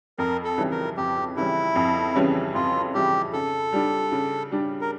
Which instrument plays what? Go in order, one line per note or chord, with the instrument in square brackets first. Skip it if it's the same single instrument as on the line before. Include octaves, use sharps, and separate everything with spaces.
[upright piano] F2 [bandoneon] A#4
[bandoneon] A4
[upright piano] C#3 E3 G3 C#4
[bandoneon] A#4
[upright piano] F2 [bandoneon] G4
[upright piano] C#3 E3 G3 C#4 [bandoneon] E4
[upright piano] F2
C#3 E3 G3 C#4
[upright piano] F2 [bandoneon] F4
[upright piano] C#3 E3 G3 C#4 [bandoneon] G4
[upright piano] C#3 [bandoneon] A4
[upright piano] G3 D4
C#3
G3 D4
[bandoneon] A#4